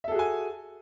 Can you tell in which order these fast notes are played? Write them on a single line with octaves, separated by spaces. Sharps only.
E5 A4 G#4 F#4 G#5